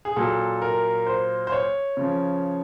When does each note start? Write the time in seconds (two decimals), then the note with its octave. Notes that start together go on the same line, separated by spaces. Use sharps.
0.05 G#4
0.16 A#2 F#3 A4
0.62 A#4
1.07 C5
1.47 C5
1.52 C#5
1.97 C#3 F3